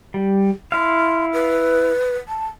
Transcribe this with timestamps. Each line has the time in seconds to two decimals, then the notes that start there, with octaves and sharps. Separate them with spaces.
0.14 G3
0.72 E4 F5 C6
1.33 B4
2.28 A5